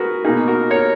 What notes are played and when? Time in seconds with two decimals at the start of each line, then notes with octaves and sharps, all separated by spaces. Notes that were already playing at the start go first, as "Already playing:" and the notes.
Already playing: F#4 G#4 A#4 B4
0.24 B2 A#3 D#4 G#4
0.48 F#4 A#4
0.71 A#4 C#5